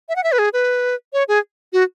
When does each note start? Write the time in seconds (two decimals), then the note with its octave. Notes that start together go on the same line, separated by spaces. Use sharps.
0.09 E5
0.16 F#5
0.24 E5
0.32 B4
0.39 G#4
0.53 B4
1.13 C#5
1.28 G#4
1.73 F#4